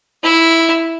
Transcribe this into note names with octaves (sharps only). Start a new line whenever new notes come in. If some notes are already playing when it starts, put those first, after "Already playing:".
E4